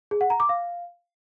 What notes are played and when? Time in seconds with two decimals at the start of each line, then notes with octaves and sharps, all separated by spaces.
0.11 G#4
0.21 F#5
0.30 A#5
0.40 D6
0.49 F5